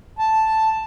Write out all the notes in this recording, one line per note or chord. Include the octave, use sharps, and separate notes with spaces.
A5